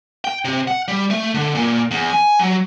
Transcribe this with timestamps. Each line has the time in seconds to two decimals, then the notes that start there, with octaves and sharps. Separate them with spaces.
0.25 G5
0.45 C3
0.68 F#5
0.88 G3
1.11 A3
1.34 D3
1.55 A#2
1.91 E2
2.10 G#5
2.39 F#3